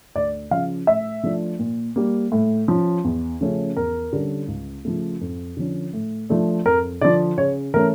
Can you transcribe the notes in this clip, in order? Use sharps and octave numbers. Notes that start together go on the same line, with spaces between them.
D2 D5
C#3 F3 F5
A2 E5
F3 A3 D4
A#2
G3 A#3
A2
F3 C#4
E2
C#3 F3 A3 C#4
E2 A#4
D3 G3 C#4
C#2
C#3 F3 A3
F2
D3 F3 C#4
A2
F3 A3 D4
F2 A#4
D3 F3 D5
C#3 C#5
E3 A3 C#4 A#4